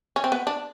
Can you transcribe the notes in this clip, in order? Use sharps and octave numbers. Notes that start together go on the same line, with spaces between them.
C#4
C4
B3
D4